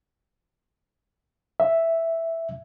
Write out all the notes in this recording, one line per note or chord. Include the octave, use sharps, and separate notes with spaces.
E5